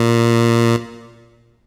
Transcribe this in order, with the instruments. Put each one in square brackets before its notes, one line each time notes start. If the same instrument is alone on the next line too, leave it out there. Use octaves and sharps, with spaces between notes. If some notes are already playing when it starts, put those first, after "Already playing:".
Already playing: [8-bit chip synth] A#2